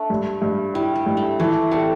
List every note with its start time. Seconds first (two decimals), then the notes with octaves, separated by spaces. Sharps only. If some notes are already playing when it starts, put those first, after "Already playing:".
Already playing: A3 D4
0.10 G2
0.42 G2
0.74 G3 E4
0.96 G3
1.06 G2
1.17 A3
1.40 E3 A3
1.71 G3 C4 A4